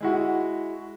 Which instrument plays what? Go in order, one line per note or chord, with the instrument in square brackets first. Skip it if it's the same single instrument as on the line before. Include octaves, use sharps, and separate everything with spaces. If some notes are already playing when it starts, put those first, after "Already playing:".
[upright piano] G#3 E4 F#4